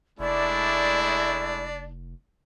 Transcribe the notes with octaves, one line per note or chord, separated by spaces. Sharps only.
F1 G#3 A3 D4 E4 D5